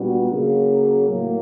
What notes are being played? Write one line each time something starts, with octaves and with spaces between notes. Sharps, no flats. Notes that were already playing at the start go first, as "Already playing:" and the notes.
Already playing: A#2 G3 B3 D4 F#4
C#3 F#3 A#3
A2 F#3 A#3